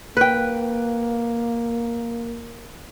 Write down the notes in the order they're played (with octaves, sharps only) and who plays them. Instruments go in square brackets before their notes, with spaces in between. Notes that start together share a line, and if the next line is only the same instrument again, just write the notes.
[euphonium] A#3 [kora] B4 G5